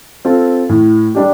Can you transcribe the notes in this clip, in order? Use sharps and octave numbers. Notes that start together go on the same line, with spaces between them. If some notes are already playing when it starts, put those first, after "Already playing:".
C4 F4 A4
A2
G3 D4 G4